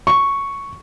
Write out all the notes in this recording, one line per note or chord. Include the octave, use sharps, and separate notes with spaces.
C#6